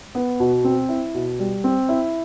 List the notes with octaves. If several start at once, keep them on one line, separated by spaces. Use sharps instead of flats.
B3
B2
C4
E4
B2
G3
C4
E4